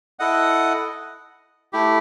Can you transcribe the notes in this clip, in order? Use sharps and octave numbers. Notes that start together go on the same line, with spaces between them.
E4 A4 D#5 F#5
A3 E4 G4